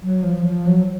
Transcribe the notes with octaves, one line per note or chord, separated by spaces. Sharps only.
F#3
F3
F3
F#3